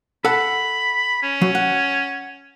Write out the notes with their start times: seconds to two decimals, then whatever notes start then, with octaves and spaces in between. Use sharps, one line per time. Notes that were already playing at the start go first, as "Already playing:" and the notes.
0.25 A4 F#5 B5
1.23 C#4
1.42 F#3
1.55 F#5